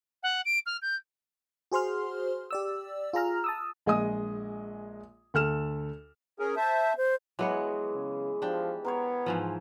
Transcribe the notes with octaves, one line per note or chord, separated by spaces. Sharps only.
F#5
D7
F6
G6
F#4 G#4 C5 C6 F6
G4 D5 E6
F4 G#4 A#5 F6
A5 D#6 E6
A#1 G#3 D#5 G#5 D#6
D2 A4 F6 E7
C#4 G#4 A#4
C5 E5 A5
C5
E3 F#3 G#3 B3 C#5
C#3
F3 D4 G4
B3 A#4 C5 C#5
G#2 E3 F3